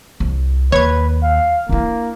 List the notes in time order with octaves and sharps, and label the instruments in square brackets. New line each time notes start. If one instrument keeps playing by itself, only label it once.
[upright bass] C2
[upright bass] D#2 [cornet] B4 [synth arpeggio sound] C#5 G#6
[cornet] F5
[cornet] A#3 [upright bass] D4 E4